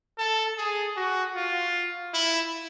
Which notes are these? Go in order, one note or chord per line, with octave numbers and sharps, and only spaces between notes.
A4
G#4
F#4
F4
E4